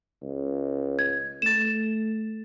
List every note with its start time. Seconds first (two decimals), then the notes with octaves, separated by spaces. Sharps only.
0.22 C#2
0.99 G#6
1.42 A3 A6 E7